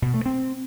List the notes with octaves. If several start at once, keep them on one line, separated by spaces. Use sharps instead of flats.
B2
A3
C4